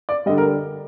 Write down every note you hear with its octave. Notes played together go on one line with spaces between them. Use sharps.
D5
D3 G3 D#5
A#4